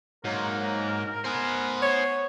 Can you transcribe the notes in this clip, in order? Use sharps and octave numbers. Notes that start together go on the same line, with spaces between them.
G#2 F#3 A#3 A#4
B3 C5 G#5
C#5